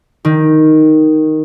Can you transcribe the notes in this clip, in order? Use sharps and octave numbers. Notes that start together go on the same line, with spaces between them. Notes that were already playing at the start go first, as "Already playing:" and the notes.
D#3